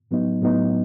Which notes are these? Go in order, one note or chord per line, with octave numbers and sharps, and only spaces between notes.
A2 F#3 B3 D#4
A2 F#3 B3 D#4